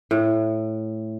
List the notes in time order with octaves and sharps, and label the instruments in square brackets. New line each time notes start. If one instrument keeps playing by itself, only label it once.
[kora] A2